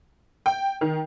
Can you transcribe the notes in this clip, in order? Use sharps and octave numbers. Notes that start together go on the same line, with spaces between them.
G5
D#3